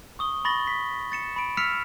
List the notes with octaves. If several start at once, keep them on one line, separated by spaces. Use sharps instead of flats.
C#6 D#6 G7
B5 C#6 A6 A#6 F#7 G7
B6
A6 C#7 E7
B5 D7
E6 F6 B6 C#7 E7 F7